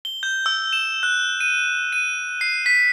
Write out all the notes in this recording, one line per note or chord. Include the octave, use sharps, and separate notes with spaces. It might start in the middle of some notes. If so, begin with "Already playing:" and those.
G7
G6
E6
E7
F#6
D#7
D#7
C7
B6